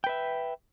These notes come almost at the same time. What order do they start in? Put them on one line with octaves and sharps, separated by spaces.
G5 B4 E5